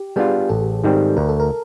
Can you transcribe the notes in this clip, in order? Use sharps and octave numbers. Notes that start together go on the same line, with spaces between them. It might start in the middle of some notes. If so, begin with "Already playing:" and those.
Already playing: G4
G3 B3 D4 F4 G#4
A1 A4
G#2 D#3 G3 C4
D2 A#4
A4
A#4